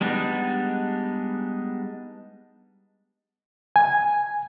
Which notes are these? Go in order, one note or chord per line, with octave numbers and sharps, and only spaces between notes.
G3 G#3 B3 D4 D#4
G#5